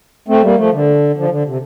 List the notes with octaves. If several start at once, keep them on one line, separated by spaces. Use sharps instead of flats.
A3 C4
G3 A#3
F3 A3
D3
D3 F3
D3
C3